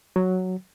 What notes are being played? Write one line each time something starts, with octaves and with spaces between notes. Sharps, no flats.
F#3